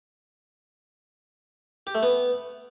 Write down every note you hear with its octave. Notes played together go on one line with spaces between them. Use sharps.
G4
A3
B3